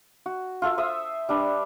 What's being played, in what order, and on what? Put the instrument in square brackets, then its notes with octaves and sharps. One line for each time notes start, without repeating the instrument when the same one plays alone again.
[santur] F#4
F4 A4 E5
C5 E5 D#6
G3 D4 B4